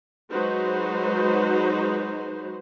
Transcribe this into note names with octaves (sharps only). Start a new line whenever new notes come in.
F#3 G#3 D#4 F#4 B4 C5